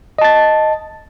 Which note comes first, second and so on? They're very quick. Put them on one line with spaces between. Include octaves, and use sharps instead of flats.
D#5 A5 A6